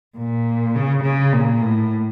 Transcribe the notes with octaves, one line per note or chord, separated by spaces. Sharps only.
A#2
C#3
C#3
A#2
A2